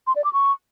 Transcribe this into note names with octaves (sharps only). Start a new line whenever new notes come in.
C6
D5
D6
C#6